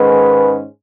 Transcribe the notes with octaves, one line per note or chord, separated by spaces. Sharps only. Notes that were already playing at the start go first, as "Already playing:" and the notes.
Already playing: G#2 D#3 G#3 C#4 B4